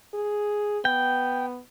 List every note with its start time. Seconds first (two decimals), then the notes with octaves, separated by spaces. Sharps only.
0.14 G#4
0.85 B3 G5